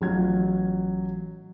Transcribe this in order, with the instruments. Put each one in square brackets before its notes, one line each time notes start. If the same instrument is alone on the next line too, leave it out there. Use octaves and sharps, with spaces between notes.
[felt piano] A1 F#3 F4 G#6